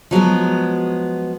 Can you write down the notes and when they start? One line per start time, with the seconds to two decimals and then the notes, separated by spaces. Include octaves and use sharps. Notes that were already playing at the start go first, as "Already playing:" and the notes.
0.11 F3 F#3 G#3 B3